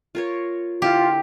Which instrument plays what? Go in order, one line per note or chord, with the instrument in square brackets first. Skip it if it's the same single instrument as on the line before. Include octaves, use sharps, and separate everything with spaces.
[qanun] F4 A#4 C#5
[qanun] D3 A#3 E4 [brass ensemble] F4 [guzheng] G4